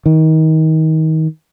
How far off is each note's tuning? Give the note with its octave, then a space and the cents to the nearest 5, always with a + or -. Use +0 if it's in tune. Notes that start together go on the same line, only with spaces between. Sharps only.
D#3 +30